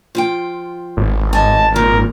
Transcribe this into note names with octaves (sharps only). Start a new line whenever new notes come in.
F3 F4 G5
G#1
D#5 G#5 A5
A#2 D#3 A#4